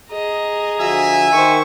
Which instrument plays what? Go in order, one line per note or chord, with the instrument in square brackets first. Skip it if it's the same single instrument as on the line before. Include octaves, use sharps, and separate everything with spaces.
[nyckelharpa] G#4 A#5 [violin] D#5
[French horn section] D3 F3 F#4 [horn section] E5 G#5
[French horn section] D#3 [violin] C5 C#6